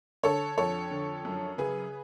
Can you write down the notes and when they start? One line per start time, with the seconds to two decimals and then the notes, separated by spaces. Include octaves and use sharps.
0.23 D3 A4 C#5
0.58 F2 A4 C#5
0.91 D3
1.25 F#2
1.58 C#3 G#4 B4